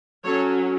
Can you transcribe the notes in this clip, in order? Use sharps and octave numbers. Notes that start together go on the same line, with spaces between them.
F#3 C#4 A4 C#5